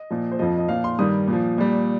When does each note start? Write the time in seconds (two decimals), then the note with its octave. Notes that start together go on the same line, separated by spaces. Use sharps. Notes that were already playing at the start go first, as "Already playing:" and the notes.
Already playing: D#5
0.10 A#2 F3
0.32 C5
0.39 F2 F3 D#5
0.58 D#5
0.69 A#2 F3 F5
0.84 C6
0.99 G2 D#3 G3 D#6
1.28 A#2
1.33 F3
1.58 A#2 G3